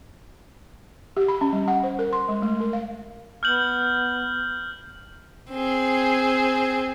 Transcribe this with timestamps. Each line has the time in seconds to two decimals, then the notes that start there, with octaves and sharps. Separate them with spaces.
1.17 G4
1.28 B5
1.41 C#4
1.53 G3
1.68 F#5
1.84 C5
1.99 A#4
2.13 C6
2.29 G#3
2.42 A3
2.61 A#4
2.73 F5
3.43 B3 F6 G6 F#7
5.51 C4 G#4